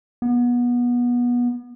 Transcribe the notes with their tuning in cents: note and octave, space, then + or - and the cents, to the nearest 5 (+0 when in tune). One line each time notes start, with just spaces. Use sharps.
B3 -25